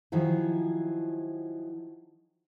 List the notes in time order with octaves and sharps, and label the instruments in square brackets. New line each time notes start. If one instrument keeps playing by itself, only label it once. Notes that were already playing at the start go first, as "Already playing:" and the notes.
[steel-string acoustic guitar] D#3 F3 F#3 E4 G#4